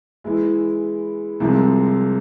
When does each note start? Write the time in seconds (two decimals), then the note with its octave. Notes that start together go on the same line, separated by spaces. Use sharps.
0.24 E3 G#3 E4
1.40 C2 C3 F3 G#3 C4